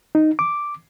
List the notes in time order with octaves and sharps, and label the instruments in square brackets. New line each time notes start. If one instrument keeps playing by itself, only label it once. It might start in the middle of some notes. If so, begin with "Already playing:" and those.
[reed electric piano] D#4
D6